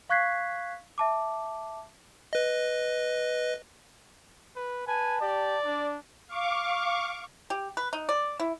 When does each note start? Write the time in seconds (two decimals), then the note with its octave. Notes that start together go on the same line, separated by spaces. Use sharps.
0.09 F5 C#6 F#6 G#6 B6 C7
0.98 E5 A5 D6
2.33 B4 D#5
4.56 B4
4.87 B4 G#5 A5
5.21 G4 D5
5.65 D4
6.26 F5 C#6 D6
7.50 G4
7.77 B4
7.93 D#4
8.09 D5
8.40 E4